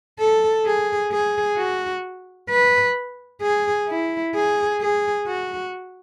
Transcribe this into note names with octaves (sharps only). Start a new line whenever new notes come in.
A4
G#4
G#4
F#4
B4
G#4
E4
G#4
G#4
F#4